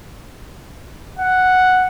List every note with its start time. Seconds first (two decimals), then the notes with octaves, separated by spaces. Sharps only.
1.19 F#5